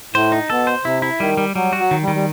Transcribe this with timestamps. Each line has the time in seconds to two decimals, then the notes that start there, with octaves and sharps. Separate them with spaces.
0.14 A2 C5
0.32 D#4
0.50 B2 A4
0.67 C5
0.85 C3 E4
1.02 E4
1.20 D#3 G3
1.37 G3
1.55 F#3 G3
1.73 F#4
1.78 F#3
1.91 D#3
2.03 G3
2.08 D#3
2.15 G3